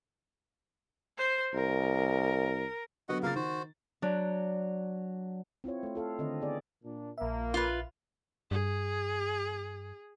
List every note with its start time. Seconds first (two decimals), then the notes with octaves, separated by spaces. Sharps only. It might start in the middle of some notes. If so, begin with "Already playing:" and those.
1.18 C5
1.54 C2 A#4
3.09 D3 F#3 B3 F#4 D#5 F#5
3.23 C#3 A#3 F4 A#4 F5 A6
3.35 D#3 F#4 C5
4.02 F#3 D4
5.64 C4 E4 F4 C#5
5.83 A3 C#5
5.95 F4 A4 F5
6.19 D3 D#3 C4 D#5
6.41 B3 G#4 D5
6.83 A#2 D4
7.18 A#1 A#2 A#3 E5
7.54 F4 B4
8.51 G2 G#4